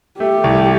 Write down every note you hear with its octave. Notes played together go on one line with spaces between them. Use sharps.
A3 G4
C2